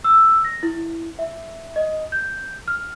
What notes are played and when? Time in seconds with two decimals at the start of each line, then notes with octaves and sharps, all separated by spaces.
0.04 E6
0.45 A#6
0.63 E4
1.19 E5
1.76 D#5
2.12 G6
2.68 F6